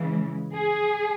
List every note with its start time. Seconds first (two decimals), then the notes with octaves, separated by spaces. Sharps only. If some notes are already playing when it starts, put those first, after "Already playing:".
Already playing: C#3 E3 G#3
0.55 G#4